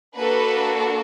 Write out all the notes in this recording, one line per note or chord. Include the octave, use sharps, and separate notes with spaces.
A#3 D4 F#4 A4 B4